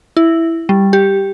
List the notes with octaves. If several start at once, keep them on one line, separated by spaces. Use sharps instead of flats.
E4
G3
G4